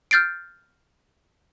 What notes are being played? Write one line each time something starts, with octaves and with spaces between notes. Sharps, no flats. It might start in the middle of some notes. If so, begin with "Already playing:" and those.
F6 G6 A6 C7 D7